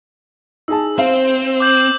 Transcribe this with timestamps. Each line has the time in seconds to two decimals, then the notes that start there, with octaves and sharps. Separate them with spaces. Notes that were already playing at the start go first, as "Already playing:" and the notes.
0.68 D#4 G#4 A5 E6
0.99 C4 C5 F5
1.60 D6 G6 F#7